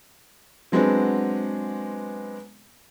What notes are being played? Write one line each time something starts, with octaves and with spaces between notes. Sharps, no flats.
F#3 G#3 B3 C4 D4